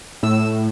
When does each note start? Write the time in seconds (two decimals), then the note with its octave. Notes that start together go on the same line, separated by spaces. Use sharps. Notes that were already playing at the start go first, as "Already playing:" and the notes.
0.23 A2 E6